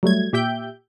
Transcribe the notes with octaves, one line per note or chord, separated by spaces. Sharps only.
F#3 G3 A3 G#6
A#2 G4 E5 G5 G6